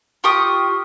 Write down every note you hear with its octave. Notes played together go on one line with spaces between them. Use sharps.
F4 G4 C#6 D#6